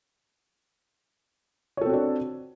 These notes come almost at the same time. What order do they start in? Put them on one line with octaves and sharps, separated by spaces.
C#5 A4 C4 F#4 D4